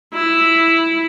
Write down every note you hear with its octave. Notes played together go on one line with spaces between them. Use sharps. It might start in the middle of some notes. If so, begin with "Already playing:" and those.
E4